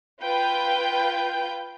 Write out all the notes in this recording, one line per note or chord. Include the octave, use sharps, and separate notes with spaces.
F4 B4 G5 G6